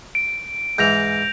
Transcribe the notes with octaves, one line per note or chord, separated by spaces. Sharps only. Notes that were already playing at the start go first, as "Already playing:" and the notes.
D7
G#2 E3 G6 A#6 F7